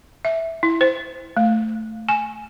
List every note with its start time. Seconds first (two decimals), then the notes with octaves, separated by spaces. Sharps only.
0.25 E5
0.63 E4
0.81 C5
1.37 A3
2.09 G#5